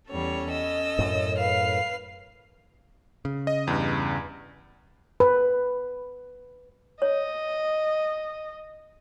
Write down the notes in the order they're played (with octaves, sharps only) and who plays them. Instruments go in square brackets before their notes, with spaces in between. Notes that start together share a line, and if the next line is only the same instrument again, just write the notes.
[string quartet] E2 G3 C#5 [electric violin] C#4 A4
[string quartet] D#5 E6
[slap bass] F#2 A2
[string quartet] B4 F6 [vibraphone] F5 [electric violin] C7
[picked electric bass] C#3
[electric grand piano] D#5
E2 G2
[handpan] B4
[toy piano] C#5 [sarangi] D#5